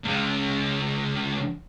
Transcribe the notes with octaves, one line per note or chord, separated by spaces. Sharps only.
C#2 C#3